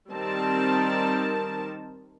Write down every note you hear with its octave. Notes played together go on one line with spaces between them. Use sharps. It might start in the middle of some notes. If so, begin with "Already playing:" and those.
D#3 G3 C4 D#4 A#4 A5